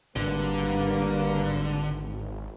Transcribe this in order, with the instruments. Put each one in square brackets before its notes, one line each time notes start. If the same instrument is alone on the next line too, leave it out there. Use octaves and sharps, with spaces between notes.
[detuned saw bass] G#1 [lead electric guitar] D3 [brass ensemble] G3 A#3 B4